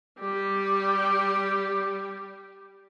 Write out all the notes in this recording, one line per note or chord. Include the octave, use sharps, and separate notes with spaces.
G3 G4